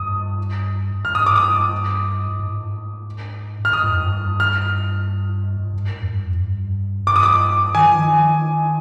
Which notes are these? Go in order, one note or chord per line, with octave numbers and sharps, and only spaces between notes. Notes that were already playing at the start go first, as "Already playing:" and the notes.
Already playing: G2 D#6
G2 F6
G#2 D#6
G2 D6
D#6
G#2
F6
G#2 D#6
G2
F2
G2
F6
G2
G#2
F2
G2
F2
G2
G2 D6
D#6
D6
D#3 G#5
F3
D#3